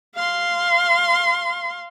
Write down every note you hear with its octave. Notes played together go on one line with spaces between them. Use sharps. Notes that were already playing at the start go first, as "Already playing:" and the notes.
F5 C6